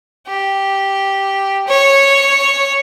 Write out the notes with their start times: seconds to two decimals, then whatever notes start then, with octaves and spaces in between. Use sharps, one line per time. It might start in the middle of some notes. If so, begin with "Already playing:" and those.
0.27 G4
1.68 C#5